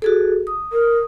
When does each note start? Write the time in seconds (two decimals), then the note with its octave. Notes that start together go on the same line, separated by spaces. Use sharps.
0.02 F#4 G#4 A4
0.47 D#6
0.72 A#4